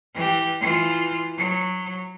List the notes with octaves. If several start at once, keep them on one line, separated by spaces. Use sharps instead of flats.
E3 G4
E3 F4
F#3